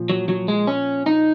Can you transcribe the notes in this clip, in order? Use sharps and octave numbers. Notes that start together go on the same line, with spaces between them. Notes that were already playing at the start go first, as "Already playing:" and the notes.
Already playing: A#2 F3
F#3
F#3
G#3
C#4
D#4